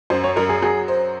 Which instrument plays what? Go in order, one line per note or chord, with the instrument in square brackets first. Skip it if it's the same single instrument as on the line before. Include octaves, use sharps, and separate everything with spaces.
[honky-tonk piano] F#2 [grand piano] C5
[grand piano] C#5
[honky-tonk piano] F#2 [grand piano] A#4
[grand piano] G#4
[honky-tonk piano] F#3 [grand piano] G#4
[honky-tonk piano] C5